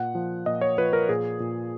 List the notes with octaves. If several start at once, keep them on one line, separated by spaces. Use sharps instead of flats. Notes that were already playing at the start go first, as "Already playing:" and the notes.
Already playing: A#2 F#5
F3
A#2 D#5
C#5
F3 B4
A#4
A#2 G#4
A#2